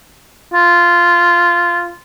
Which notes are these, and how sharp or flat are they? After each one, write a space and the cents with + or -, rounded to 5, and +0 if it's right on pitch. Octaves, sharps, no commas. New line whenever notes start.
F4 -10